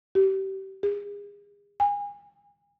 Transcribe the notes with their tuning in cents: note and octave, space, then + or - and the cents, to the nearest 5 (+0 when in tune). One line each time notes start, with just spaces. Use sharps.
G4 -30
G#4 -35
G#5 -30